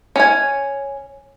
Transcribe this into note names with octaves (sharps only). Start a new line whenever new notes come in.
C#4 G#5